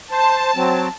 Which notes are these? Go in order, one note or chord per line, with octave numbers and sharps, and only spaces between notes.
C5 A5
F#3 C4